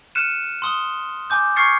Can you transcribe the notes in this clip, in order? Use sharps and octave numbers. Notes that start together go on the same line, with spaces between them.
F6 F#6 C#7 D#7 E7
C6 D#6 G7
G#5 D6 G6
C#6 F6 G#6 A6 C7 C#7